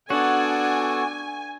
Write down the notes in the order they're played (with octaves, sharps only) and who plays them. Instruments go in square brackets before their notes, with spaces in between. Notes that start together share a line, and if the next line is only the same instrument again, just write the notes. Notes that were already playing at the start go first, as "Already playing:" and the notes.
[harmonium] B3 A4 [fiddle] D4 [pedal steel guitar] F#4 [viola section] G#5